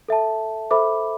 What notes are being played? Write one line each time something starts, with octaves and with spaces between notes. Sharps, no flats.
A4 E5 A5
A4 C5 E5 B5 D6